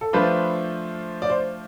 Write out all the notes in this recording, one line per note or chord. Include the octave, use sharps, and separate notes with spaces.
A4
F3 A3 D4 F4 B4 C5
D5
C5